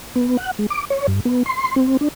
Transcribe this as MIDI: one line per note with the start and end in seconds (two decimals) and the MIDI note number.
0.16 0.37 59
0.37 0.51 78
0.59 0.66 56
0.70 0.85 86
0.90 1.07 73
1.08 1.20 43
1.25 1.43 59
1.46 1.76 84
1.76 1.97 60
2.01 2.08 62